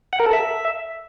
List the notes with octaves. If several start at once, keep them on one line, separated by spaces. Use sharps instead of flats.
F#5
A#4
A4
E5